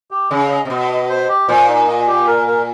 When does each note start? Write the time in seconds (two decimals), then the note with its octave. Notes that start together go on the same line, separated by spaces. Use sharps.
0.11 G4
0.30 C#3 D#5
0.50 D#5
0.65 C3
0.70 B2 D#5
0.89 D#5
1.09 C5
1.29 G4
1.48 A#2 C5
1.68 D#4
1.88 D#5
2.07 G4
2.27 A#4
2.47 A#4